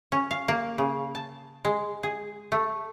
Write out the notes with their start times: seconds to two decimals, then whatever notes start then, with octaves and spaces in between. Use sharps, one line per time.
0.12 C#4
0.31 F5
0.48 A#3
0.78 C#3
1.15 A5
1.65 G#3
2.03 G#4
2.52 A3